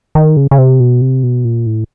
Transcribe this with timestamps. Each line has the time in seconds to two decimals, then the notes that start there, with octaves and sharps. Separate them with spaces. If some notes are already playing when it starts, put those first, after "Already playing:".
0.15 D#3
0.37 C#3
0.51 C#3
0.58 C3
0.80 B2
1.01 C3
1.23 B2
1.45 A#2
1.66 A2